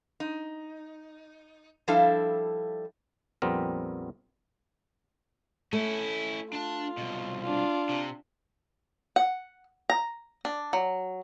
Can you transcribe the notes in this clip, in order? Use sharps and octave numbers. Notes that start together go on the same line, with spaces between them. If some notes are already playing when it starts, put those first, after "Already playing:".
D#4
F3 G3 D4 E4 A4 F5
A#1 F2 G3 B3 C4 A#4
A3 C#4 E4
D4 F4 A5
C2 B2
D4 F4
C3
F#5
A#5
D4
F#3